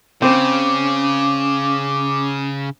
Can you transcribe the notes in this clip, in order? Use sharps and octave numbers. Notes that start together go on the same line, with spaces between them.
C#3 C4 C#4 D6